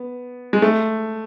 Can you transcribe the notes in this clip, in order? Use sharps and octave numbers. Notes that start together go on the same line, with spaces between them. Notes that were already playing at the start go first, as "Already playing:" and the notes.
Already playing: B3
G#3
A3